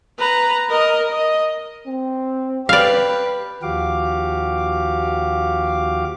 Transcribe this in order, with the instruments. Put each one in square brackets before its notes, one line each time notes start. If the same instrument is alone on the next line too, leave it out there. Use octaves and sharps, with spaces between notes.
[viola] B4 A#5
A#4 D#5
D#5
[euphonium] C4
[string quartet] G4 B4 [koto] D5 F5
[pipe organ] D#2 F3 F#4 G4 F5 D6